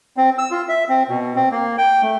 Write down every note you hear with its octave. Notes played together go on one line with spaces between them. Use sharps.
C4
E6
F4
E5
C4
B2
C4
A#3
G5
A3